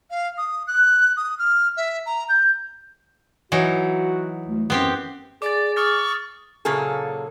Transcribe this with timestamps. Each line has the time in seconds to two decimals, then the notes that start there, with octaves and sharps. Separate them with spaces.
0.10 F5
0.37 D#6
0.67 F#6
1.16 D#6
1.39 F6
1.77 E5
2.06 A#5
2.29 G6
3.52 E3 F#3 D#4 F#4
4.47 D2
4.70 F#2 B3 C4 G4
5.42 G#4 D5 D6 A6
5.76 C#6 D#6 F6 A6
6.65 A#2 C#3 F#3 A#3 G#4 A4